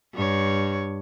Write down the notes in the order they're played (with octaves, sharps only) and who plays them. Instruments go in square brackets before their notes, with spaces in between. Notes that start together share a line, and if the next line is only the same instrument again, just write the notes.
[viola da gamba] G2 C#5